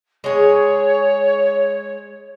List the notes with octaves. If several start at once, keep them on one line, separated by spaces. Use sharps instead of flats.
G#3 G#4 C#5